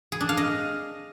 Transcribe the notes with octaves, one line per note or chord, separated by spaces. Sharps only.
G#4
D4
F5
D#5